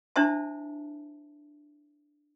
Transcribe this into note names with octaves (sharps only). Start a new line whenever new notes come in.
D4 E4 C5 E5 A5